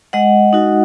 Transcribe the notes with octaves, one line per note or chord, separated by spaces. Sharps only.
G#3 D#5 F#5
D#4 F#4